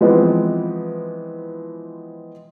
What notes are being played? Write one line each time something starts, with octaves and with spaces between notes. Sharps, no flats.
E3 F3 G#3 B3 C4